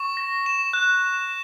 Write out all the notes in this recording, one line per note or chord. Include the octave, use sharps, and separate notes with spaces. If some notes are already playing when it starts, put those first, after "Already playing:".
Already playing: C#6
A#6
E7
F#6